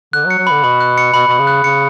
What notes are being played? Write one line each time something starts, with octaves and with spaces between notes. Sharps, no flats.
D3 F#6
F#3
C#7
F#3
D3 B5
B2 B5
F#6
C#7
B2 B5
B2 B5
C#3
F#6
C#3 C#7